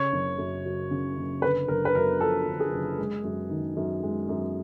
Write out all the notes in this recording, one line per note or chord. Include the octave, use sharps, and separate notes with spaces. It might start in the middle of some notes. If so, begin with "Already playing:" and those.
Already playing: C#3 C#5
F#1
F#2
F#3
C#3
F#1
D3 B4
F#1 A#4
B4
F#2 A#4
F3 A4
D3
G#4
F#1
G#3
F#2
D#3
F#2
G#3
F#2